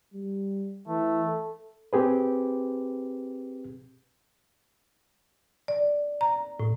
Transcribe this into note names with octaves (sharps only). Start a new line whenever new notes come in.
G3
E3 A3
A4
C4 G4 G#4 B4
D5
A#5
A2